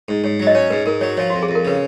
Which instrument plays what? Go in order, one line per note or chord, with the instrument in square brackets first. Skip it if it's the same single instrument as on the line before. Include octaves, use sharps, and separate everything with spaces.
[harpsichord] G#2
[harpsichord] G#2 [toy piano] C#5
[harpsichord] F#3
[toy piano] D#5
[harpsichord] C#4 [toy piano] C#5
[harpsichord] G#2 [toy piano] B4
[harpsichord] G#2 [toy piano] A#4
[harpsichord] F#3 [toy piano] C#5
[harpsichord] F3 [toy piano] C#5
[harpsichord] F2 [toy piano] F#4
[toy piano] G#4
[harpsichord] F2
[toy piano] A#4
[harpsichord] C#3 [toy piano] B4